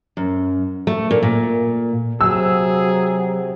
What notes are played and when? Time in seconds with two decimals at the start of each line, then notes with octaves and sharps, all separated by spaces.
0.17 F#2
0.87 A3
1.11 A#2
1.22 A#2
2.21 C3 F#3 G#4 E6